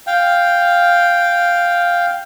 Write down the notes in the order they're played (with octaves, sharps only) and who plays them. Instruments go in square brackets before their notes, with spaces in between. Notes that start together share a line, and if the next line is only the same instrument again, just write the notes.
[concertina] F5 G5